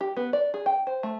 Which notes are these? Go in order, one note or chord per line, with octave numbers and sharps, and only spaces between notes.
G4
B3
D5
G#4
G5
C5
A3